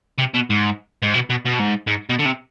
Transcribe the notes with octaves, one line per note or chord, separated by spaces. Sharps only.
C3
B2
G#2
G#2
B2
B2
B2
G#2
G#2
B2
D3
C3